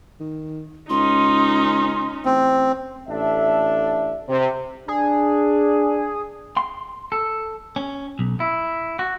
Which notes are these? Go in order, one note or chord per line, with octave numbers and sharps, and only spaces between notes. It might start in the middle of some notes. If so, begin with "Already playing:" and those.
D#3
C#2 C#4 D#4 C6
A1 C4
A1 D4 A4 E5
C3
D4 G#4
C6
A4
C#4
B1
E4
F#4